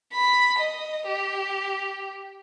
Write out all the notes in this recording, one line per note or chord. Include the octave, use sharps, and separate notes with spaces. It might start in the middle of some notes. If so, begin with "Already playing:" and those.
B5
D#5
G4